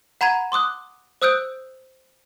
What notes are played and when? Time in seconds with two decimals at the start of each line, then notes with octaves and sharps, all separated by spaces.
0.21 F#5 A#5 B5 G#6 D#7
0.52 C6 D6 D#6 F#6
1.22 C5 D#6 E6 F#6 G6 D7